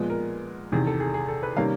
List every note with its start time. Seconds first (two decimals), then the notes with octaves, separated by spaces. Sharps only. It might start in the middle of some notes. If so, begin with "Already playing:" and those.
Already playing: A#2 F3 G#3 B3
0.10 A#4
0.72 E2 C3 D#3 G#4
0.87 A4
1.00 G#4
1.14 G#4
1.28 A4
1.43 B4
1.56 C3 D#3 G3 A#3 C#4 F5